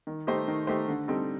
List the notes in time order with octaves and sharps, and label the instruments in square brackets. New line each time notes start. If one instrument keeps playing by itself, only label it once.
[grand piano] D#3
A3 D#4 G4 C5
D#3
A3 D#4 G4 C5
D3
G3 C4 D#4 A4